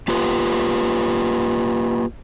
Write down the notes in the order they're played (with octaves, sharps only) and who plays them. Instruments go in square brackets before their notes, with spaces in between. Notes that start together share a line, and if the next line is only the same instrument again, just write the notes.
[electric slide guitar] A#3 F4 G4 B4